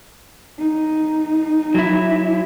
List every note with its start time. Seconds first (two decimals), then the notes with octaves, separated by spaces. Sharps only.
0.58 D#4
1.74 F#3 E4